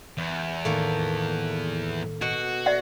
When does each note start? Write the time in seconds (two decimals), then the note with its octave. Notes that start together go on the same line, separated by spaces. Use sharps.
0.17 E2
0.65 A2 D#3 A3 A#3
2.21 B2 F#4
2.66 D5 E5 F#5